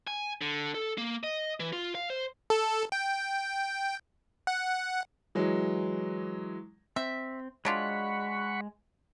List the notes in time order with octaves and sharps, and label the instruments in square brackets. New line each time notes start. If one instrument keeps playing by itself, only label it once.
[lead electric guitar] G#5
D3
A4
A#3
D#5
E3
F4
F5
C5
[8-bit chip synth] A4
G5
F#5
[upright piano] E3 F#3 G#3
[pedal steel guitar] C4 [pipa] E5
[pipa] F#3 D4 F4 [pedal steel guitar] G#3 [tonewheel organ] F#5 B5 C#6